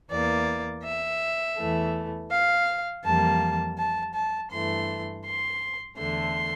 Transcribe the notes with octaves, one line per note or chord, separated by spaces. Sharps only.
E2 E3 A#3 D5
E5
E2 E3 A3
F5
F2 E3 G3 A#3 A5
A5
A5
G2 E3 A3 C6
C6
E2 D3 A3 C6